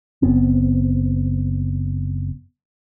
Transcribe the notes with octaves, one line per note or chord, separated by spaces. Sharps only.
F#1 B3 C4